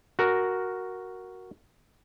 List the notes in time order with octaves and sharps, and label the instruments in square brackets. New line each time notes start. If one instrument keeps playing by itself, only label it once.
[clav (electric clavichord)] F#4 A#4